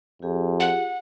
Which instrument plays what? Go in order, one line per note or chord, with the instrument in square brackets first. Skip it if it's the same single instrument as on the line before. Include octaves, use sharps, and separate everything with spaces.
[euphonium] F2 [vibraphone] F4 G4 G#4
[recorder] F#5